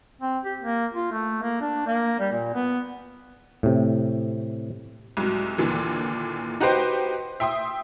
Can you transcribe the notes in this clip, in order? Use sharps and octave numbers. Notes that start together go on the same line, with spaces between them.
C4
G4
A#3
F4
A3
A#3
D4
A#3
G3
A#2
B3
A2 C3
C2 G#2 F#3
D#2 A#2 D3 E3
D#4 F#4 G4 B4 C5 G5
E5 G5 C6 D#6